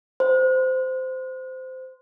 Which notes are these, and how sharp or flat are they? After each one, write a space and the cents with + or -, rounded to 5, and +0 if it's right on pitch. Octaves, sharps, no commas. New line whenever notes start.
C5 -15